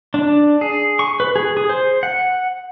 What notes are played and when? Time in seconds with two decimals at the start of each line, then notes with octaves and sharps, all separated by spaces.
0.14 D4
0.61 G#4
0.99 C#6
1.20 B4
1.36 G#4
1.57 G#4
1.69 C5
2.03 F#5